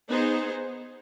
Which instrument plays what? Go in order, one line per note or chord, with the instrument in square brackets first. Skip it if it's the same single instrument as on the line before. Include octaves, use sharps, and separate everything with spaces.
[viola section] B3 D#4 G#4 C5